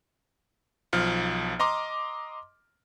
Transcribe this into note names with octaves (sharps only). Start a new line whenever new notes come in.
B1 F3 F6
D#5 A#5 C6 D6